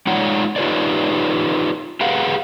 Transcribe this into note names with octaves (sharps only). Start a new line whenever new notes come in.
G#3 D#4 F4 C#5 D5 F#5
D#4 F4 G4 B4 C#5 D5
G4 G#4 B4 F5 F#5